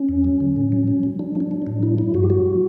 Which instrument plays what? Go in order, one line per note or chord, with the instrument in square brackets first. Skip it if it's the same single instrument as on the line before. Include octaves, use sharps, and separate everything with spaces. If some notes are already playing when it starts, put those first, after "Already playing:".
Already playing: [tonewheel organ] C#4
E2
F#3
D3
A2
F#3
F#3
F#3
F#3 D4
F#3
D4
F#3
A2 D4
F#3 E4
F#3 E4
G2 F#4
G4
F#3 F#4